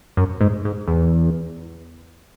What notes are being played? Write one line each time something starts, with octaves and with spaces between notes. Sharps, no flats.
F#2
G#2
G#2
E2